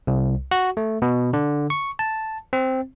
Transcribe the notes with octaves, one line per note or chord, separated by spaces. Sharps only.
C2
F#4
A3
B2
D3
C#6
A5
C4